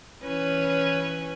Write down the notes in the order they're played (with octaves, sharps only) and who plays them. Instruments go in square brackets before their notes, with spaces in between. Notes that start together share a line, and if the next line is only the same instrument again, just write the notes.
[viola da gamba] E3 C#4 B4